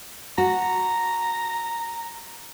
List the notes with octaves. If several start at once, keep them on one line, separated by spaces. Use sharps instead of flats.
F#4 A#5